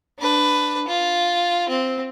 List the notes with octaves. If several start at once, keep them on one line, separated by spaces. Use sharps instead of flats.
D4 B4
F4
C4